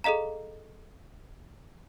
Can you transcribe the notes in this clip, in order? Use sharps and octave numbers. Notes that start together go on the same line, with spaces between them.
G#4 A4 D#5 F5 A#5